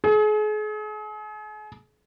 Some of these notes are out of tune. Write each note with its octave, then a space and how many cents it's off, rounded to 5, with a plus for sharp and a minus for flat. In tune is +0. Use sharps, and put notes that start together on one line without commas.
G#4 +40